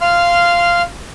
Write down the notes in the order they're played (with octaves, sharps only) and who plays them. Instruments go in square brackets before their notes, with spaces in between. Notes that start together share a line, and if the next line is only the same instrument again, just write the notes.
[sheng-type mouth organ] F5 C6 F6